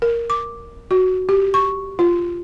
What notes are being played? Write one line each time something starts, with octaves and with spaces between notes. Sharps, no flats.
A#4
D6
F#4
G4
C#6
F4